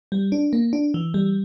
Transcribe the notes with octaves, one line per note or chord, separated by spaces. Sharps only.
G3
D4
A#3
D4
E3
G3